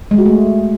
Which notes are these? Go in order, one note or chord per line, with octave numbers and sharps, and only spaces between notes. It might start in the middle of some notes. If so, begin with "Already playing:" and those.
G#3
F#4
A3